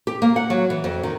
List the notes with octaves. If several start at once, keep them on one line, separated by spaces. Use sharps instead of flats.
G4
A#3
F#5
F#3
E3
F2
D#3